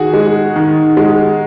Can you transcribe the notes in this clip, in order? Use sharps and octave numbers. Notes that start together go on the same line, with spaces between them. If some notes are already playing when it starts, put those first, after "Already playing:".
Already playing: D#3 F#4 G#4
G#3
D#3
G#3